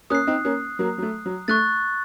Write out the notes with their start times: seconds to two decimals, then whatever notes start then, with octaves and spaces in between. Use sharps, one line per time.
0.10 A#3 C#4 D#6 F#6 C7
0.27 C4 D#4
0.45 A#3 C#4
0.79 F#3 A#3
0.98 F#3
1.02 A3
1.26 F#3
1.48 A3 C#6 F#6 A6